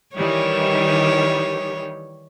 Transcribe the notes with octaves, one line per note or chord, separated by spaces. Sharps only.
D#3 E3 G3 C#5